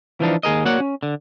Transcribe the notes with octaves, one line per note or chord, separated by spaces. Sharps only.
E3 F3 D4 D#4
D#2 G#4 A#4 D#5
A#3 F#4 C#5 D5 F#5
C#4
D3